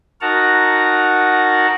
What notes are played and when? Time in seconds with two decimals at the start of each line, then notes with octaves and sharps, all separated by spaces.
0.21 D#4 F#4 A#4 F#5 A5 A#5